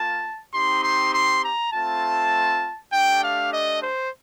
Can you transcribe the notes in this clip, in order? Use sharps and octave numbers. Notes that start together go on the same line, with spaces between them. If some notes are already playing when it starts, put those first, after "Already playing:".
Already playing: A#3 F4 A5
C4 D#4 G4 C6
C6
C6
A#5
A3 C4 F4 A5
A3 D4 G4 G5
F5
D#5
C5